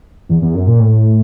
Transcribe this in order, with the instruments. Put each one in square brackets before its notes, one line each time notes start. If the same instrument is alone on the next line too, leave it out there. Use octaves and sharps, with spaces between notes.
[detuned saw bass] E2
E2
F#2
A#2
A2